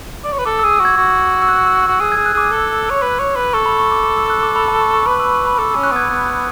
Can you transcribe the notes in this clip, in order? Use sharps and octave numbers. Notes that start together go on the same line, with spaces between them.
D5
C#5
B4
A4 D6
E6
G#4
E6
F#4
G#6
F#4
E6
F#6
E6
F#4 E6
G#4
G#4 G#6
F#6
G#4 D6
A4
C#5
B4
C#5
B4
A4 C#6
B5
C#6
D6
D6
E6
F#6
D6
B5
A5
C#6
C#6
B4 D6
E6
C#6
B5
A4 D6
C#4 E6
F#6
B3 G#6
B3 F#6